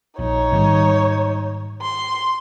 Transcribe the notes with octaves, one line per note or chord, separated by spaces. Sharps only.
A#1 D#4 C#5
G#2 D#3 G3
C6